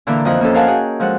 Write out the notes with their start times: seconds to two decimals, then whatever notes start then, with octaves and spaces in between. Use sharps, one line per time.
0.07 A#2 D3 E3 A#3 D4 E4
0.25 F2 E3 F3 D#5 F#6
0.41 A#3 C#4 A4
0.54 A#4 F5 F#5 G#5 A5
0.68 F#4 G#4 G5
1.00 F3 G#3 A4 F#5